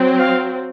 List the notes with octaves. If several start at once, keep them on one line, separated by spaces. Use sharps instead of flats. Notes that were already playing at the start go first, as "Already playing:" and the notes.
Already playing: F#3 C4
F5